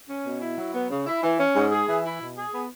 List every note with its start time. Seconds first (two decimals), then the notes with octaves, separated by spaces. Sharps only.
0.08 C#4
0.24 B2
0.42 E4
0.57 F#3
0.74 B3
0.90 C#3
1.07 E4
1.22 E3
1.39 C#4
1.55 G#2
1.72 G#4
1.88 E3
2.05 E4
2.20 B2
2.37 G#4
2.53 B3